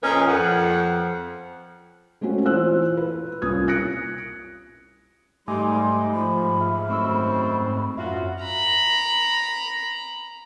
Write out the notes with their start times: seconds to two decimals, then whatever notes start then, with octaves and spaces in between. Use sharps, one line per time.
0.03 F2 A#2 C#4 A#4 B4 D#5
0.27 F2 F#5
2.21 G#3 A3 C4 C#4 F#4
2.46 E3 F4 C5 E6 F#6
2.97 B4
3.42 C2 C#4 F4 D#6 G#6
3.67 D#6 F#6 A#6 C#7 D7
5.48 G#2 G3 A3 D#4 G#5 C6 D6
6.13 F3 B5
6.60 G#4 E5 F6
6.89 F#2 D#3 A3 C4 C#6 E6
7.97 F#2 F4 F#4 E5
8.44 A#5 B5